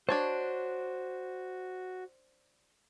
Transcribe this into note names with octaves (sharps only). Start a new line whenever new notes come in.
D4 F#4 C5 C#5 A5